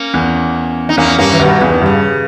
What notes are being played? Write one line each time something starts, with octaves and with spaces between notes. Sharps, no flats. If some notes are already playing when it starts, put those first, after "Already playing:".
Already playing: A#3 C#4
E2
D#4
E2 A#3 C#4
G2 A#3 C#4
E3
G2 B2 D#3
E2 C#3
D#3
G2 C#3